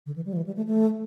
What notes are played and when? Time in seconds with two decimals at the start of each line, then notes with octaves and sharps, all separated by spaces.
0.06 D3
0.16 E3
0.26 G3
0.33 F3
0.37 E3
0.46 G3
0.56 A3
0.67 A3